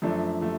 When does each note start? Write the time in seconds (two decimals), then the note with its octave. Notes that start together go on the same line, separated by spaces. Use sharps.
0.02 F#2 F3 A3 D4
0.41 F3 A3